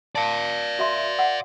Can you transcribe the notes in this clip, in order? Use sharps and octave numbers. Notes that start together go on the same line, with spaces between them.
D5 F5 A5
F#4 E5 C6
F#5